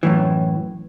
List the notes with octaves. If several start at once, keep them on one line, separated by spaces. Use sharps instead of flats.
F#2 A2 E3